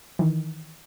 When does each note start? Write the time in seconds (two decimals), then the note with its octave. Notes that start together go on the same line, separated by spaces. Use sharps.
0.19 D#3 E3